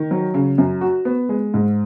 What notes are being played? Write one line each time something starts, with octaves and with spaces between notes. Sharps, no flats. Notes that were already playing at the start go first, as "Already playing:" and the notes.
Already playing: D#3
F#3
C#3
F#2
F#4
B3
G#3
G#2